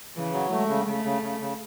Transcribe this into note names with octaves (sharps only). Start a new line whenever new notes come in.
C#3 E3
F#3
G#3 A3
C#3
C#3 A3
C#3
C#3
C#3